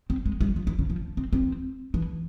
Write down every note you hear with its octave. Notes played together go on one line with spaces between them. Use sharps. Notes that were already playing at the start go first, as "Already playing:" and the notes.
C4
G#3
G3
F3
E3
C#3
F3
C4
C4
E3